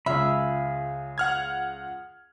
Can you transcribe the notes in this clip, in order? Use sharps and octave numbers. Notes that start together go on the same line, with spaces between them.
C#2 F4 G#4 E5 F5 B5
F#5 F6 G#6